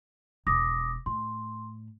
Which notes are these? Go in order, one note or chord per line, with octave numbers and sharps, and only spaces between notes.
E1 D6 D#6 A#6
A2 C6